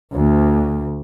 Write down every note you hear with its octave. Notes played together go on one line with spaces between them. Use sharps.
D2